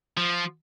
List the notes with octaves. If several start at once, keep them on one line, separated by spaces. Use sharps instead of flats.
F3